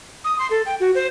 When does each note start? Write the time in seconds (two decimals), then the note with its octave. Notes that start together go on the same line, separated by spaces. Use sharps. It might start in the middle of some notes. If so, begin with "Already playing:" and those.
0.24 D#6
0.39 C6
0.51 A4
0.66 G5
0.80 F#4
0.95 C5